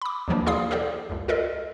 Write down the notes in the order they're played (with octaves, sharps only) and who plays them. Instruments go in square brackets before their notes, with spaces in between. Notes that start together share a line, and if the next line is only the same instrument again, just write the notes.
[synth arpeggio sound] B5 D6
D#2 B2 E3 F3 A#3 D4
E4 G#4 D5 F5 C6 D#6
G4 A4 C5 D5 F5
C#2 F#2
F4 A4 A#4 D5 D#5